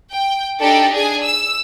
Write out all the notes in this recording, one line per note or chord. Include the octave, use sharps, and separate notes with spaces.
G5
D4 D#4 G4 A4 D5 G5
D4 G#4 G#5
E6